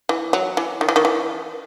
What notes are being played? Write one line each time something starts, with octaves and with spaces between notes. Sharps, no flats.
E3
F#3
E3
D#3
E3
D#3
E3